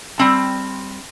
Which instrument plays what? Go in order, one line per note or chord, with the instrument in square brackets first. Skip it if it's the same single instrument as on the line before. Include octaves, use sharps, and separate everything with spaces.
[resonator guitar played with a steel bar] G3 C4 A5